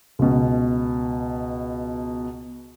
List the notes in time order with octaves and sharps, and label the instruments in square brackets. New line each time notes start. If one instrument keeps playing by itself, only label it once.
[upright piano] C#2 B2